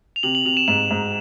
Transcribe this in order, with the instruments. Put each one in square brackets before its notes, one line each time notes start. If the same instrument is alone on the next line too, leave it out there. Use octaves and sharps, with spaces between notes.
[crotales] F7
[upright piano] C3 [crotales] F#7
[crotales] F#7
[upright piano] C3 [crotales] F7
[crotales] E7
[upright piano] G#2 [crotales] E7
[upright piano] G#2